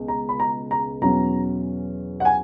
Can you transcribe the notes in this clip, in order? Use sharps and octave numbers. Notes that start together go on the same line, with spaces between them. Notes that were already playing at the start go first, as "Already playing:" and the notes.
Already playing: C#2 B2
A#5
B5
A#5
A#5
E2 B2 F#3 C#4 A#5
F#5
G#5